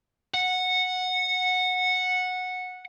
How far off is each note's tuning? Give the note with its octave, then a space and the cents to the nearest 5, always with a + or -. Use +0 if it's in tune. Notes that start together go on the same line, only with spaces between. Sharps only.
F#5 -10